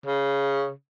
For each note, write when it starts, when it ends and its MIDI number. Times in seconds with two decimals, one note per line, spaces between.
0.06 0.71 49